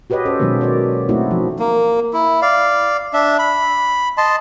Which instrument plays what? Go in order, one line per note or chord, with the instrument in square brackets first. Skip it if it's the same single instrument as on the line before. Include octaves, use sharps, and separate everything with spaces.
[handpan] F#4 G4 B4 C#5 D#5
C#4 A4 C5
B2 D#3 F#3 G#3 A#3
C#5 D5
A3 C4 D#4 E4 F#4
F3
[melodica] A#3
E4
D5 F5
D4 E5
B5
D#5 A5 C6